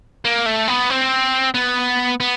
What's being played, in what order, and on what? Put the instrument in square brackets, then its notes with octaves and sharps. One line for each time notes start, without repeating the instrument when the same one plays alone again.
[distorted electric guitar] A#3
A3
B3
C4
B3
B3